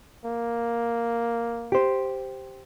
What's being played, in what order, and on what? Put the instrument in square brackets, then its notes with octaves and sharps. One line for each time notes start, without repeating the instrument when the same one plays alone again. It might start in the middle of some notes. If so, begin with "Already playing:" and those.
[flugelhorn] A#3
[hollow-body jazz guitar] G4 C5